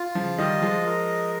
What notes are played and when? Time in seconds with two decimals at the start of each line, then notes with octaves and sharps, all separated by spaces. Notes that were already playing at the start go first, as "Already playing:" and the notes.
Already playing: F4
0.15 C#3 F3
0.38 D#3 G3 D#5
0.62 F3 G#3
0.86 A#4